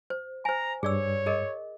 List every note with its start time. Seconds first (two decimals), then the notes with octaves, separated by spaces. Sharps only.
0.10 C5
0.45 C5 G#5 A#5
0.83 G2 G#4 C#5 D5 E6
1.26 G#4 A#4 D#5